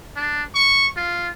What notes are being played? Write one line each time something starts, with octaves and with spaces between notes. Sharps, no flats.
D4
C#6
F4